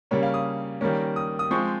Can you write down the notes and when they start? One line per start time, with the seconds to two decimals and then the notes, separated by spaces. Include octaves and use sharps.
0.11 C#3 G3 A#3 C#4 C#5
0.23 F5
0.34 D#6
0.81 D#3 G3 A#3 C#4
1.16 D#6
1.39 D#6
1.51 F3 G#3 C4 C#6